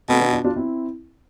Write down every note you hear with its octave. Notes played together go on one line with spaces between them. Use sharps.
B2 A3 C4
B3 D4
D4 F4
D4 F4
C4 E4